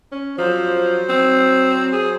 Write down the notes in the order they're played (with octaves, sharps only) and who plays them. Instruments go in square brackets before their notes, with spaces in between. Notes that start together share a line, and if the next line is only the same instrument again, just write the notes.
[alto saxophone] C#4
[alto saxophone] F3 [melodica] F#3 C5
[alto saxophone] C4
G#4